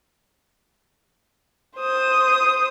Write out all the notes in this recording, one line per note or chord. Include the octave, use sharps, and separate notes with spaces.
C5 D#6